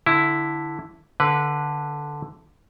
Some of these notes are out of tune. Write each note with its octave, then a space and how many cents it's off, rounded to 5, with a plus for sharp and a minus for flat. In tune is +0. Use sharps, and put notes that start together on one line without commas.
D3 +0 E4 +0
D3 +0 B4 -10